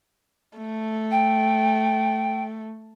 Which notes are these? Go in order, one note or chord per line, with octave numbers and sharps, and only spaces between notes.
A3
G5